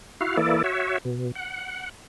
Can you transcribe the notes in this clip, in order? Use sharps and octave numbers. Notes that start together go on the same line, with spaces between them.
E4 F#4 F5
E3 A#3 E4 A4 D5
F#4 C#5 E5
B2
F#5